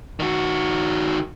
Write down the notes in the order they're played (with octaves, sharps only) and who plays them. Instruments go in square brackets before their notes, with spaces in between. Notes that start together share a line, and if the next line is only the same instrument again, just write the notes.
[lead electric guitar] D#3 F#4